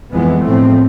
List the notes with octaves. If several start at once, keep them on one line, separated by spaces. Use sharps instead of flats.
F2 E3 G#3 B3
A2 F3 A3 C4